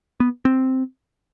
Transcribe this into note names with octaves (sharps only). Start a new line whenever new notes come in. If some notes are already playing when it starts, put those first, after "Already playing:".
B3
C4